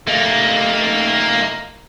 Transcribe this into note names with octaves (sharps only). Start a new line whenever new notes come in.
A3 A#3 D#4